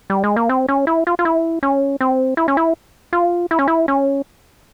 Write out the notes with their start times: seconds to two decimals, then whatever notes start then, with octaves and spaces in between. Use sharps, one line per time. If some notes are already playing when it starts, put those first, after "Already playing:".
0.10 G3
0.24 G#3
0.36 A#3
0.49 C4
0.69 C#4
0.87 E4
1.07 F4
1.19 F4
1.25 E4
1.63 C#4
2.01 C4
2.37 E4
2.48 C#4
2.57 E4
3.13 F4
3.51 E4
3.59 C#4
3.68 E4
3.88 C#4